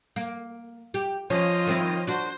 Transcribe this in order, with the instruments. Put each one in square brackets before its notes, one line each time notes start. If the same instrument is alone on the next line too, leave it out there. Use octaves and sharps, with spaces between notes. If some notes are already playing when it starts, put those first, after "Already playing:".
[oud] A#3
G4
[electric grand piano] F3 C5 C#5 [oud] C#4 [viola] F4 D#5
[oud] D#3 C4 E4
[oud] D4 F#4 [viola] C5